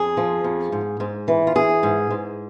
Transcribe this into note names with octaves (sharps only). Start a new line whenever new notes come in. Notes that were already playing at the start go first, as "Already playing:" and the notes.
Already playing: F2 G#4
F3
F2
G#2
G#2
E3
F4
E3 G#4
G#2
G#2